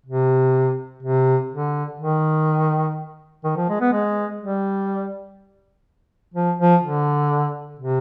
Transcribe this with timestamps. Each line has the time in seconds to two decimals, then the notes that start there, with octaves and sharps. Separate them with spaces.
0.06 C3
1.03 C3
1.51 D3
1.99 D#3
3.44 D#3
3.56 F3
3.69 G#3
3.81 B3
3.93 G#3
4.41 G3
6.34 F3
6.59 F3
6.83 D3
7.79 C3